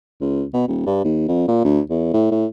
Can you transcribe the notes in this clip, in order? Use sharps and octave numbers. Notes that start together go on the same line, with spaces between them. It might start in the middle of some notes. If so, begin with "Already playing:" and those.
C#2
B2
D#1
G2
D#2
F2
A#2
D2
E2
A2
A2